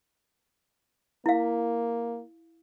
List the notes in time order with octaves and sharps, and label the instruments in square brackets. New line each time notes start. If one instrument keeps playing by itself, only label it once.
[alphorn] A#3 [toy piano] E4 F5